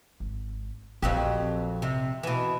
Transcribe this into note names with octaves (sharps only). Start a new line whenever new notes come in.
G#1
A#1 F2 F#3 C4 G4
C3
B2 E3